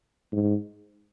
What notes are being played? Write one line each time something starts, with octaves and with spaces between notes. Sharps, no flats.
G#2